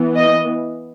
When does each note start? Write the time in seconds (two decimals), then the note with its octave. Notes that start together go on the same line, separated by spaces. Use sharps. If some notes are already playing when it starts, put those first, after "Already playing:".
Already playing: E3 B3
0.16 D#5